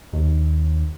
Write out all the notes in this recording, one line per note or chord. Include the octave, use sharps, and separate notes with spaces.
D#2